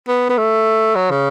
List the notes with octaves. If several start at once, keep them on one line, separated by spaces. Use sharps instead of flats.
B3
B3
A3
F#3
C#3